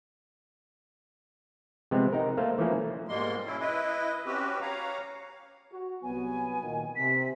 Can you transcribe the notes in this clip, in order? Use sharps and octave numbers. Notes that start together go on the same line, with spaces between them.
C3 F3 G#3 B3 C4
D#4 A#4
A3 A#3 C5 F5
E3 F3 A3 A#3 C#4
G#2 B2 G3 G#3 A#3 C6
C#4 E4
E4 B4 D#5
C4 C#4 F#4 G4 B4
C#5 F5 A#5
F#4
C2 F#3 B3 G#5
A#2 D#3
C3 B6